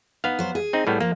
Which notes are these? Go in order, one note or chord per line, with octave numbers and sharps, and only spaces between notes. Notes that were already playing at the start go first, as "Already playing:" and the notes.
B3 D#4 F5
F#3 C5
G#4
C4 D#4
A2 G3 B3
F3 A#3